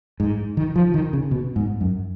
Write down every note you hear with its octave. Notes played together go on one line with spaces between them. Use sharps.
G#2
D#3
F3
D#3
C#3
B2
G#2
F#2